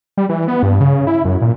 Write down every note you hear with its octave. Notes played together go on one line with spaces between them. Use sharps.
G3
E3
B3
G2
C#3
E4
F#2
A#2